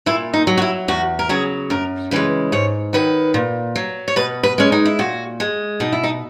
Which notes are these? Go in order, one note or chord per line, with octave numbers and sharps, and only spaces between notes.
A#2 E4
D#4
F#3
F#4
E4
E2 F#4
A#4
C#3 F#3 G#4
F#2 A#4
C#3 E3 G#3 B4
G#2 C#5
D#3 F#3 B4
A#2
F#3
C#5
B2 B4
B4
G#3 C#4
D#4
E4
A#2 F#4
G#3
B2 D#4
E4
D#4